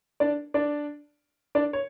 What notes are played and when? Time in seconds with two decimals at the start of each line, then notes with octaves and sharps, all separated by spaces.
0.20 D4 D5
0.54 D4 D5
1.55 D4 D5
1.73 C#5